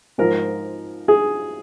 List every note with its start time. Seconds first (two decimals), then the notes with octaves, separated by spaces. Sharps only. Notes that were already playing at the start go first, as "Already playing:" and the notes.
0.18 G#2 F3 A#4
1.08 G#4